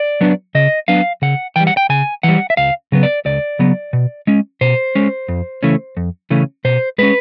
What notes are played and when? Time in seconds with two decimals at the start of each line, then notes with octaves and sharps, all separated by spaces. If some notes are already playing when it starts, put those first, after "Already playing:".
Already playing: D5
0.21 F#3 B3 D4
0.55 C#3 D#5
0.88 F#3 B3 D4 F5
1.22 C#3 F#5
1.56 E3 G3 G5
1.67 F#5
1.77 G5
1.89 C#3 G#5
2.23 E3 G3 F#5
2.50 E5
2.57 C#2 F5
2.92 C#3 F#3 B3
3.03 D5
3.25 C#2 D5
3.59 C#3 F#3 B3
3.93 B2
4.27 G#3 C#4
4.61 B2 C5
4.95 G#3 C#4
5.28 F2
5.63 C#3 E3 A3 C#4
5.97 F2
6.30 C#3 E3 A3 C#4
6.65 B2 C5
6.98 G#3 C#4 B4